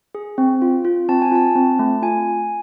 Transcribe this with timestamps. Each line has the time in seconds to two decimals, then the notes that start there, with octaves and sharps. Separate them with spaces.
0.15 G#4
0.38 C4
0.62 F4
0.85 F4
1.09 C4 A5
1.22 G#5
1.32 F4 A5
1.55 C4
1.79 A3
2.02 F4 G#5